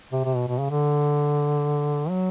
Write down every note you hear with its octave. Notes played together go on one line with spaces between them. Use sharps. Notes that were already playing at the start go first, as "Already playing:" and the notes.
C3
C3
B2
B2
C#3
D3
F#3